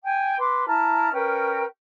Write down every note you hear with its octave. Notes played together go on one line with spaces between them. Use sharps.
G5 G#5
B4 C6 D6
E4 A5 A#5 F6
C#4 A#4 B4 G5